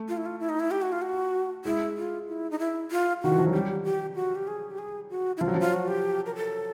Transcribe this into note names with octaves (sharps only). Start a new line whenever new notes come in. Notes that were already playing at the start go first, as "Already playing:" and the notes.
Already playing: A3
F4
E4
F4
E4
D#4
E4
G4
F#4
F4
F#4
G#3 E4
F4
E4
D#4
E4
F4
D#3 F#4
E3
F3
F#3
G3 G4
G4
F#4
G4
G#4
G4
G#4
F#4
E4
F3 F4
F#3
F3
F4
F#4
G4
A#4
A4